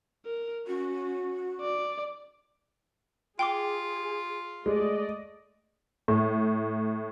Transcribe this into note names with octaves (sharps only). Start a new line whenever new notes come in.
A#4
C#4 F#4
D5
F4 G#4 G5 C6 D6
G#3 A3 D5 D#5
A2